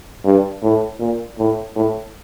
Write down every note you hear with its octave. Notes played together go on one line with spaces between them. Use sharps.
G2
A2
A#2
A2
A2